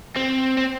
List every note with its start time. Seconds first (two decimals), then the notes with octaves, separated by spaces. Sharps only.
0.17 C4
0.57 C4